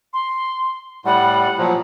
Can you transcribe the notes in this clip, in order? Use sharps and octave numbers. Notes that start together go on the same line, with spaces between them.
C6
A2 G3 F#5
A#2 F3 F#3